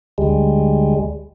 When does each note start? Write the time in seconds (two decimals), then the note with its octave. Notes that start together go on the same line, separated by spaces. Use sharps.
0.18 D2 G3 G#3